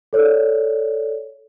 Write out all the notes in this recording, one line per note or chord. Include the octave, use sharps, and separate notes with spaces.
A4 C#5 D5